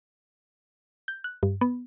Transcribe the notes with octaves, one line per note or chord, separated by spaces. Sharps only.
G6
F#6
G2
B3